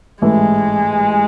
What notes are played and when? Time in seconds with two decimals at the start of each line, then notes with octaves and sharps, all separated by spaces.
0.22 A1 G#2 E3 G#3 A3 E4